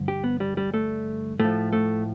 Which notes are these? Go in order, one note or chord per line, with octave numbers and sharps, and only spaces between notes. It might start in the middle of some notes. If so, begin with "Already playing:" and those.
Already playing: G2 D3 F3
G4
B3
G3
G3
A3
A2 F3 A3
A3